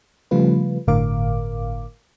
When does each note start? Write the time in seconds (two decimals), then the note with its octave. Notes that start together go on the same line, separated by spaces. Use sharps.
0.31 C#3 F3 G3 A3 F4 B4
0.87 G1 A2 D3 A#4 F5 D6